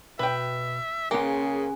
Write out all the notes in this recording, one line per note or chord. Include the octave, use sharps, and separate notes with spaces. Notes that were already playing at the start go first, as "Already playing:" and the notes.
B2 B4 E5 G5
C#3 A#3 C#4 G#4 G#5